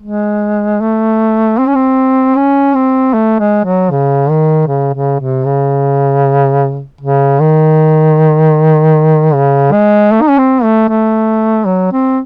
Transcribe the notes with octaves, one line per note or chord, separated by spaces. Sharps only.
G#3
A3
C4
C#4
C4
C#4
C4
A3
G#3
F#3
C#3
D#3
C#3
C#3
C3
C#3
C#3
D#3
C#3
G#3
A3
D#4
C#4
C4
A3
A3
F#3
C4